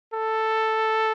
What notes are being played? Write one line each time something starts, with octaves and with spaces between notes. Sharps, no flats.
A4